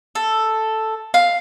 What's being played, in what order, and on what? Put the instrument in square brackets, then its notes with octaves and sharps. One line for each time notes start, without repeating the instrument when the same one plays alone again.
[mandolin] A4
F5